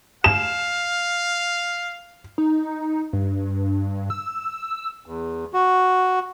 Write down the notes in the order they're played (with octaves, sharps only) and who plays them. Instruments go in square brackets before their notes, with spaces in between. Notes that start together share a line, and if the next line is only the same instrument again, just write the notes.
[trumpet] F5 [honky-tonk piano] E7
[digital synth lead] D#4
G2
E6
[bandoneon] E2
F#4